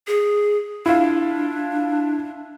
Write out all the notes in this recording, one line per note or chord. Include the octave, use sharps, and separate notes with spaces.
G#4
D4 E4 F4